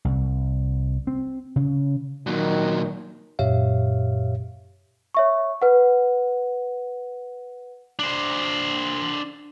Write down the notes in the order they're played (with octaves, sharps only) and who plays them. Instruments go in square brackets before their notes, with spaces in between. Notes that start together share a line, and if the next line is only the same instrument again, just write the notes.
[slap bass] C2
C4
C#3
[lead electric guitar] A#2 F#3 [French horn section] D#3
[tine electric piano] F#2 A#2 G4 C#5 E5 F5
[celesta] C#5 E5 C#6
B4 F#5
[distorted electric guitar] D4 C5